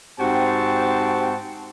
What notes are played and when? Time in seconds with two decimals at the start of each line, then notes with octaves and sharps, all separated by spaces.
0.19 G#2 C4 F#4 G4 G5 A5